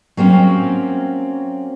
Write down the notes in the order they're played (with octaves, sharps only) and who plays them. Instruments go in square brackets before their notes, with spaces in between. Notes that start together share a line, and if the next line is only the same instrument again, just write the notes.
[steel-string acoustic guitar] F#3 A#3 C4 C#4